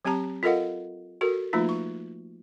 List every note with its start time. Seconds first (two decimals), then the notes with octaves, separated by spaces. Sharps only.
0.05 F#3 C4 G4 A5 A#5
0.43 F4 A4 A#4 D#5 F5 F#5
1.21 F#4 A4 A#4
1.53 F3 A3 A#3 D#4 F4
1.69 C#6